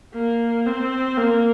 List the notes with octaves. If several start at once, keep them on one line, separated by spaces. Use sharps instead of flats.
A#3
C4
A#3